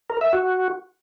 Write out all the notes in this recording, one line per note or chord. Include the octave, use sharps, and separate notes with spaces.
A#4
E5
F#4